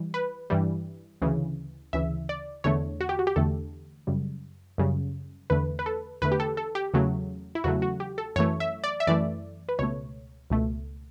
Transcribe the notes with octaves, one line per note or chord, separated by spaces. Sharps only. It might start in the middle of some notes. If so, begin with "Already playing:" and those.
Already playing: E3 G3
B4
G2 E3 G3
D2 C#3 E3
D2 C#3 E3 E5
D5
E2 D3 A3 C#5
F#4
G4
F#4
G4
E2 D3 A3 A4
F#2 C#3 G3
F#2 C#3 G3
E2 D3 A3 B4
B4
A4
E2 D3 A3 B4
G4
A4
A4
G4
E2 C#3 F#3 A3
E4
E2 C#3 F#3 A3 F#4
F#4
G4
A4
F#2 E3 A3 C#5
E5
D5
E5
F#2 E3 A3 D5
B4
C#2 B2 A3 C#5
C#2 B2 A3